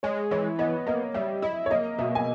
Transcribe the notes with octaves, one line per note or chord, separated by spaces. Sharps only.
G#3 C#5
E3 C#5
B3 D#5
A#3 D#5
G3 E5
E4 D#5
C#5
A#3 D#5
B2 E5
G#5